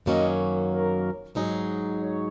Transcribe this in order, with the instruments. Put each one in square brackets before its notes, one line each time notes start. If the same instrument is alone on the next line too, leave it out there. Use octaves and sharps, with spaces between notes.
[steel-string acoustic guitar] F#2 D#3 F#3 A#3 C#4 [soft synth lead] D#5
[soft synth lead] A#4
[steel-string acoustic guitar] G#2 F#3 D#4 G#4
[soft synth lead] C#5